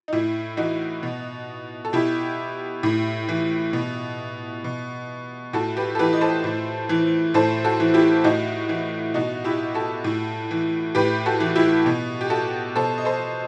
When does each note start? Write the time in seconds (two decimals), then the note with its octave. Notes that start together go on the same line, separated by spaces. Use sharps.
0.08 D#4
0.13 A2 E4
0.57 E3 D#4 F#4
1.03 B2
1.85 A4
1.93 B2 E4 G4
2.83 A2
3.29 E3
3.73 B2
4.64 B2
5.53 A2 F#4 A4
5.77 G4 B4
5.95 A4
5.99 E3 G4 B4
6.13 D#5
6.21 A4 C5
6.44 A2
6.89 E3
7.34 A2 A4 C5
7.65 F#4 A4
7.80 E3
7.94 E4 G4
8.24 A2 D#4 F#4
8.69 E3
9.14 B2 D#4 F#4
9.44 E4 G4
9.74 F#4 A4
10.04 A2
10.51 E3
10.95 A2 G4 B4
11.26 F#4 A4
11.40 E3
11.56 E4 G4
11.86 B2
12.21 G4
12.30 F#4 A4
12.76 B2 A4 C5
12.98 D#5
13.05 A4 C5